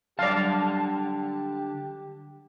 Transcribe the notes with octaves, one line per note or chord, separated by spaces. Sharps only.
D3 F#3 G3 G4 D5 F5 A5